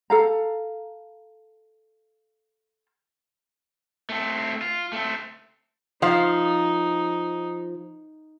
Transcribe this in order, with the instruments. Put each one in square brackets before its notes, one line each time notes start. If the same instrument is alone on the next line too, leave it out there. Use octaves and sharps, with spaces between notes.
[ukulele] A4 F5 A#5
[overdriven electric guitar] A3 C4
F4
A3 C4
[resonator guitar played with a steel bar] F3 F5 [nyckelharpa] D#4